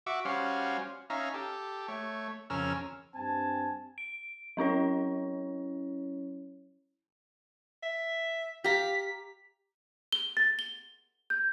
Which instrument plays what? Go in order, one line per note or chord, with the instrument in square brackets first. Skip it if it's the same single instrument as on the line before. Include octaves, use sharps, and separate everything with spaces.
[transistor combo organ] F#4 E5 C#6 D6
G3 C#4 F#4 C5 F5
C#4 D#4 E5 F5 A#5
G4 A4
A3 C#5
F2 C#3 C#4 A#4 E6 F6
[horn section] G2 C4 G#5 A5
[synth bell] D7
F#3 C#4 E4 C#5
[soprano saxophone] E5
[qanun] G4 A#5 [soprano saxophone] F5 [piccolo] B6
[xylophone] G7
A6
G7
G6